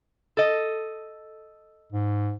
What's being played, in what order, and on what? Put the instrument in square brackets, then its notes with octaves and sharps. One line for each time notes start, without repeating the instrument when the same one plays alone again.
[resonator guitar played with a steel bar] A4 D#5
[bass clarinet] G#2